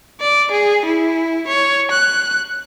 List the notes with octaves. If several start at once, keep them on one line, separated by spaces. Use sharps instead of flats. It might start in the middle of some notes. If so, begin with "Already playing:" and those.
D5
G#4
E4
C#5
F#6